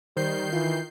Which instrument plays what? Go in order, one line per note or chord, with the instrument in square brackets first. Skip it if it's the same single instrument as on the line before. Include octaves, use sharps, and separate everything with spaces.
[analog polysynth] D#3 G6 C7 [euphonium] G3 [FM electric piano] C5
[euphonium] E3 [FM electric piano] F4